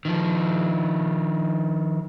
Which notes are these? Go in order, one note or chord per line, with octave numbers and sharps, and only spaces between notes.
D#3 F3